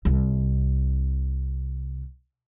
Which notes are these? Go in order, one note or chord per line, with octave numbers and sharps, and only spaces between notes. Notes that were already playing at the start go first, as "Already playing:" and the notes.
C2 C3